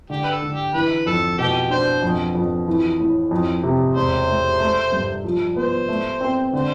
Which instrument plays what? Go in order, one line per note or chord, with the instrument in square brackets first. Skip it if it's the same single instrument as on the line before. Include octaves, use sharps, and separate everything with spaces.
[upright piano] D3 [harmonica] G4
[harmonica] B4
A4
[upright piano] D3
[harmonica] G4
[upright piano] E3 [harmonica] B4
[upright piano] F2 [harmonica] A4
[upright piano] B2 [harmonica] G4
[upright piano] D4 [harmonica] C5
[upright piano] F2
F2
E3
A2
F2
C3
[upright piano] E1 [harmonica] C5
[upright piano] A3
A3
G2
F3
[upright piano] B3 [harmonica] C5
[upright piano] A3
C4
[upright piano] D3 [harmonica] C5